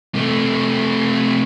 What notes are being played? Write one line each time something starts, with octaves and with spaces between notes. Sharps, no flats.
C3 A3